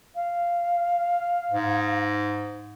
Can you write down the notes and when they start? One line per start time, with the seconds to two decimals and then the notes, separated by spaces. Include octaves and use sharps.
0.15 F5
1.51 G#2